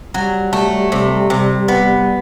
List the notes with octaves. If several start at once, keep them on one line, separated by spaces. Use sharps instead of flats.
F#3 G3
A3
C3
C3
B3